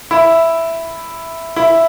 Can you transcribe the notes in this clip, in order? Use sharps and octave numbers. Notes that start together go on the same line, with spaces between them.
E4
E4